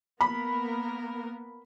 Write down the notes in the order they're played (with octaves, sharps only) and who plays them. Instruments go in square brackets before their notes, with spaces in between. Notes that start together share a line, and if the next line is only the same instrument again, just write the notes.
[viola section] A#3 B3 A#4 [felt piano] B5